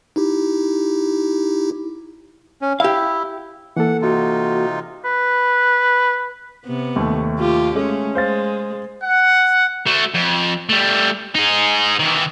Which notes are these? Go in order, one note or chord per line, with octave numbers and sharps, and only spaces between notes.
D#4 E4 G4
C#4
E4 G4 F5
E3 A#3 A4 F#5
C3 D#4 F4 F#4
B4
C3 B3
D#2 A3
F4 G4
G#3 A3 C#4
G#3 C5 F5 A6
F#5
A3 F#4
F2
G3 A3
D#4 G#4
D#3 E3